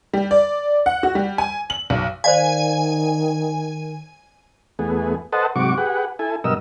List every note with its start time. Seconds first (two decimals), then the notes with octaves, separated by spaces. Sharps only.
0.13 G3
0.31 D5
0.86 F#5
1.03 F#4
1.15 G3
1.38 G#5
1.70 F#7
1.90 B1
2.24 D#3 C5 D5 F5 G#5
4.79 E2 A3 B3 G#4
5.33 A4 B4 C5 D#5 F#5 A5
5.56 G#2 C3 F#3 F#4 C#6 D6
5.77 G4 G#4 B4 F#5
6.19 E4 A4 G#5
6.44 G2 B2 F#3 A#4 D#5 E6